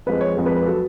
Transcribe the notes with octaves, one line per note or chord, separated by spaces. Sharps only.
F2 F3 G#3 B4
C#5
F2 F3 G#3
B4
B4
F#3 A4